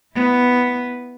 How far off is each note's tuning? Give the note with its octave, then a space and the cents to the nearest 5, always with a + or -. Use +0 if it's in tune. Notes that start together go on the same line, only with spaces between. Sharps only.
B3 +0 E4 +0